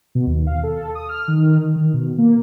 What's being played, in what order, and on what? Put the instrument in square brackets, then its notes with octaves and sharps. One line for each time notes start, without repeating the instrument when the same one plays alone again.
[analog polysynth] B2
D#2
F5
A4
D#6
F6
D#3
D#3
B2
A#3